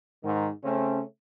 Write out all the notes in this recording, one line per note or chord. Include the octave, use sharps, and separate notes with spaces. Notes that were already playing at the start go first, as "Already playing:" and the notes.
G#2 D#3
C#3 A3 C4 C#4